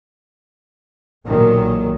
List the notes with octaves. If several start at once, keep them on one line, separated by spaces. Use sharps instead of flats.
B1 A#2 D#3 F#3